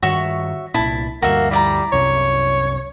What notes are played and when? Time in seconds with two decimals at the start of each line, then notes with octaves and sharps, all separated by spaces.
0.03 G2 D#3 F#4 C#5 E5
0.74 C2 A#2 E4 A5
1.22 D2 G2 A#3 F#4 E5
1.51 G3 E4 D5 A#5
1.93 C2 F#2 C3 C#5